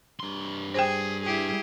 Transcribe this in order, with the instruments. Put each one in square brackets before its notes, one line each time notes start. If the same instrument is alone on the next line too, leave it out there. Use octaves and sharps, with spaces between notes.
[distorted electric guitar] G2 C6
[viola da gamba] G#4 [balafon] C5 G5
[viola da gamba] E4 G4 G#4